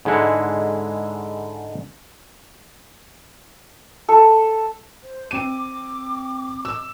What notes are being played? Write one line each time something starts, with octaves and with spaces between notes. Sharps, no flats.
G#2 D3 G#3 E4 F#5
A4
C5
C4 D6 D#7
E6